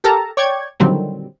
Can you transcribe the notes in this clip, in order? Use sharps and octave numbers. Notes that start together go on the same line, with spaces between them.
G4 A4 A#4 A5 A#5
C#5 D5 G5 C#6 G#6
A#2 D3 D#3 F#3 G3 C4